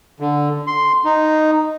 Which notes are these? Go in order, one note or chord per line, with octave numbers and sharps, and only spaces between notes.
D3
C6
D#4